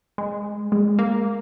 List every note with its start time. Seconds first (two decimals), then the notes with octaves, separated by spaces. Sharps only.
0.18 G#3
0.72 G#3
0.99 A#3